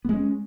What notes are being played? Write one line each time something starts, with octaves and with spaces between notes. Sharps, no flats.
G#3 B3 C#4